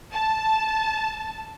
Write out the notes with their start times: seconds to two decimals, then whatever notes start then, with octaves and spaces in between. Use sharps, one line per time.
0.13 A5